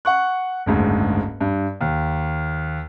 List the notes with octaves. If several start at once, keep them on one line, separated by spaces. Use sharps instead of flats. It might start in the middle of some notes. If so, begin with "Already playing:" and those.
F#5 C#6 F#6
F#1 D2 G#2
G2
D#2